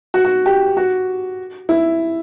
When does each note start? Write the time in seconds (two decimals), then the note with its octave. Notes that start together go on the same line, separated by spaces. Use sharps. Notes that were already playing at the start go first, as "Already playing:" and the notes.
0.14 F#4
0.25 F#4
0.46 G4
0.77 F#4
1.69 E4